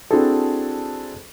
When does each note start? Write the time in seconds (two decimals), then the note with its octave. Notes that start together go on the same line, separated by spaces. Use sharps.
0.11 C4 D4 E4 F#4 G#4 A4